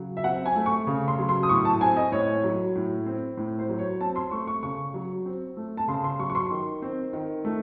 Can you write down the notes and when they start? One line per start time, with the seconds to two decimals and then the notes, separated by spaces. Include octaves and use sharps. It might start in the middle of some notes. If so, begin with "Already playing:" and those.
Already playing: C#3 F#3
0.17 E5
0.24 C4 F#5
0.46 G#5
0.56 A3
0.66 C#6
0.87 C#3
1.08 C6
1.18 F#3
1.29 C6
1.43 D#6
1.49 A2 C#6
1.65 A5
1.81 C4 G#5
1.97 D#5
2.12 A2 C#5
2.44 F#3
2.76 A2
3.06 C4
3.37 A2
3.59 C5
3.69 F#3
3.79 C#5
4.00 C4 A5
4.16 C6
4.31 A3 C#6
4.47 C#6
4.63 C#3 C#6
4.94 F#3
5.26 C4
5.57 A3
5.77 A5
5.88 C#3 C6
6.04 C6
6.19 F#3 C#6
6.30 C#6
6.35 C6
6.50 D#3
6.82 C4
7.13 D#3
7.45 A3